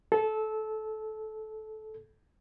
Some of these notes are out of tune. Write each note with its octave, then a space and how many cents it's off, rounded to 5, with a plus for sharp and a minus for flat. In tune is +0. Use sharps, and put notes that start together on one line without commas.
A4 -20